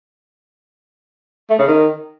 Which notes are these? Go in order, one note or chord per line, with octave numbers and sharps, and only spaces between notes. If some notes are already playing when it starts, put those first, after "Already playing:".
A3
C#3
D#3